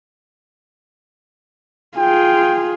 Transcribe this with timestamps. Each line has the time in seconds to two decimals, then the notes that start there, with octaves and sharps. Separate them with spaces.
1.98 F4 G#4 G5